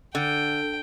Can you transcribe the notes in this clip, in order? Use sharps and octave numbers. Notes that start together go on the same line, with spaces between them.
D3 G5